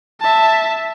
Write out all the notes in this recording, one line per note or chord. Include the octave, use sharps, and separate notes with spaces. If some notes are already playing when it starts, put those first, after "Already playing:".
E5 A5